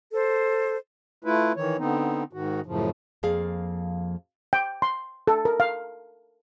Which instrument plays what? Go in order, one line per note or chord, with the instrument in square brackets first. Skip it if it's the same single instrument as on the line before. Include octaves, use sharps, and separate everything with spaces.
[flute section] A4 C5
[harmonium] A3 E4 F4 B4
D#3 E3 C#5
D3 B3 C4 D#4
G#2 D#3 F#4
F#2 A2 C#3 F3
[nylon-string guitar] F2 F3 A#3 G#4 F5
[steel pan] G5
C6
A4
A#4
F5